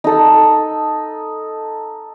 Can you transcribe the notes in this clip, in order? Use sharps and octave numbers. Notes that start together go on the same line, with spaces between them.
D#4 A4